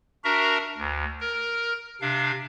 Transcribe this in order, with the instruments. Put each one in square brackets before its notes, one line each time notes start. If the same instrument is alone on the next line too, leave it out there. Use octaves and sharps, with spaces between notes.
[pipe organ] D4 F#4 A#4 E5 A#5
D2
A#4
C3 D4 F5